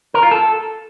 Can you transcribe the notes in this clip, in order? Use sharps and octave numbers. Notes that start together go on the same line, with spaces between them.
A#4
F4
A4